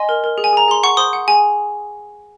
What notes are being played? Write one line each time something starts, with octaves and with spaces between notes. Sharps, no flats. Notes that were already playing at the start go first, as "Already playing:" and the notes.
Already playing: D#5 G#5 C6
A#4
A#4
G#4
G#5
G#4 A#5
G#4 C6
F#5 C#6
C5 C6 D#6
F#5
G#4 G#5